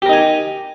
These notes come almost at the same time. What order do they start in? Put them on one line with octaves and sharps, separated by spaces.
G4 A#4 D#4 G#5